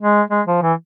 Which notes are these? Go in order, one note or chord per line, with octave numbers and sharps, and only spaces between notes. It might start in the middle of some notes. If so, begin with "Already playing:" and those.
G#3
G#3
F3
E3